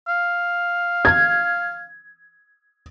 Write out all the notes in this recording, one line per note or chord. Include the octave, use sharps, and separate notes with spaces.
F5
G#6